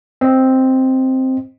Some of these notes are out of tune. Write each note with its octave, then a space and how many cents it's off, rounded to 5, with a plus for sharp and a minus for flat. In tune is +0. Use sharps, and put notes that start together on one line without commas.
C4 +0 D#5 +0